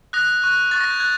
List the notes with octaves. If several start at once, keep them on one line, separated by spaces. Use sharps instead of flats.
D#6 F#6 A#6
C#6 F#6
C#6 F#6 A6
A#6
G6
F#6 G#6